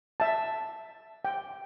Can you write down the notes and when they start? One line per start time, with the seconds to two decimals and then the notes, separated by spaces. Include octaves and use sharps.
0.20 E5 A5
1.25 G5